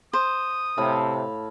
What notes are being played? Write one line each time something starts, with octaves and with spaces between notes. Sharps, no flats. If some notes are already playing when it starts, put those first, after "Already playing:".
C5 D#6
A2 C3 F5 B5